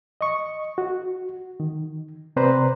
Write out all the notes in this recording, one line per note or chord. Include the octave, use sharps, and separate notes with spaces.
D#5 C#6
F#4
D#3
C3 C4 B4 C5 D5 A#5